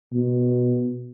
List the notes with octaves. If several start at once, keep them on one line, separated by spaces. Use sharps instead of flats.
B2